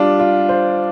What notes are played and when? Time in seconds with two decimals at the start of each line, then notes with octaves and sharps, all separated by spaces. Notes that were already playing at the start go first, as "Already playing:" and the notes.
Already playing: G3 D4 F4
0.20 F4
0.49 C5